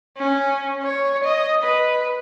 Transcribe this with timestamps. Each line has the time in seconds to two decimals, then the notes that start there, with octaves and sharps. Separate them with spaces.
0.18 C#4
0.83 C#5
1.24 D#5
1.63 B4